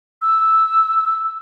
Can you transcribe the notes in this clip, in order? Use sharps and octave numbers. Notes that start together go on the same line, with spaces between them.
E6